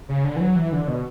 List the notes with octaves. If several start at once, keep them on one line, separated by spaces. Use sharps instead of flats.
C#3
D3
E3
F#3
E3
D3
B2